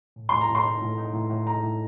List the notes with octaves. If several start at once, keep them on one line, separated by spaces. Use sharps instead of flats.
A2
A2 C6
A#5
A2
C6
D#4
A2
D#4
A2
A2
D#4 A#5
A2